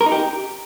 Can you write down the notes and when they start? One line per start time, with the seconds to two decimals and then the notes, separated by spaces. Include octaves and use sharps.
0.01 A#4
0.06 D#4
0.12 G4